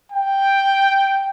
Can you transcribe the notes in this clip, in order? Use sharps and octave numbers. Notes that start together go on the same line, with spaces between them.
G5